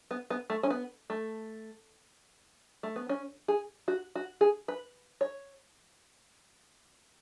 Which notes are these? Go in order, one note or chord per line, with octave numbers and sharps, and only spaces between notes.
B3
B3
A3
C#4
B3
A3
A3
B3
C#4
G#4
F#4
F#4
G#4
B4
C#5